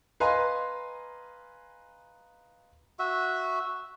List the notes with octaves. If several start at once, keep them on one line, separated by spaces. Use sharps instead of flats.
B4 D#5 F5 G#5 A#5 C6
F#4 E5